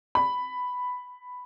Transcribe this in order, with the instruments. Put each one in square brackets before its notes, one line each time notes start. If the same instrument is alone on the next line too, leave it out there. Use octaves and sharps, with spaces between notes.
[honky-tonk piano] B5